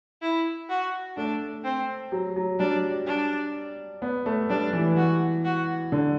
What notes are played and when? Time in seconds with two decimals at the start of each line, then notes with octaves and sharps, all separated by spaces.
0.22 E4
0.70 F#4
1.17 A3 D4
1.65 C4
2.12 F#3
2.36 F#3
2.59 G3 D4
3.07 D4
4.02 B3
4.26 A3
4.50 G3 D4
4.73 E3
4.97 F#4
5.45 F#4
5.92 D3